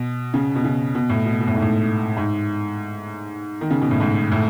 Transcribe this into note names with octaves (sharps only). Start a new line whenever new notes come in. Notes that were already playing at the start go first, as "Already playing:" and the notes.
Already playing: B2
C#3
B2
C#3
B2
A2
B2
B2
A2
G#2
A2
G#2
D#3
C#3
B2
A2
G#2
A2